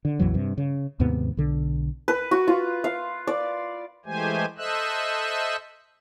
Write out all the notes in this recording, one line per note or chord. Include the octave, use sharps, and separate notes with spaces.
D3
A#1 F2 E3 F#3
G2 C3
C#3
D#2 G#2 C3 B3
B1 D3
B4
F#4
F4
F5
D5
E3 G#3 A3 G4 C5 G#5
A4 C5 D#5 E5 E6 F#6